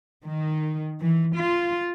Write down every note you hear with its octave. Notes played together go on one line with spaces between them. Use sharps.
D#3
E3
F4